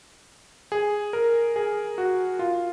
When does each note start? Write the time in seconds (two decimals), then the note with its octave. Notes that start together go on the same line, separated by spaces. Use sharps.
0.72 G#4
1.13 A#4
1.56 G#4
1.98 F#4
2.39 F4